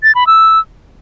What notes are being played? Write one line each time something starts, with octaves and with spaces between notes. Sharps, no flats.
A6
B5
E6